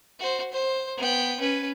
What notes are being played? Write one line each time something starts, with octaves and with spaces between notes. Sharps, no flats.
F#4 C5
C5
B3 G5
C#4 B4